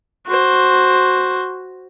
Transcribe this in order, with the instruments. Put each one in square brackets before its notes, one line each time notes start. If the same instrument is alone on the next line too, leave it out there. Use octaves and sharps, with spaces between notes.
[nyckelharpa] F#4 C5